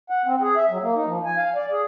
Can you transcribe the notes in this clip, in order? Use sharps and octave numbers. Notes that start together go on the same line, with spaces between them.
F#5
C4
G#4
E5
F#3
A#3
D#4
F3
G#5
F5
D5
G#4